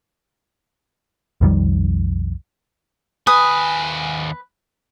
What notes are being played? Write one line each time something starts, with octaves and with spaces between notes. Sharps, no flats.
B1 F2 D#3 G3
D#2 B4 G#5 D#6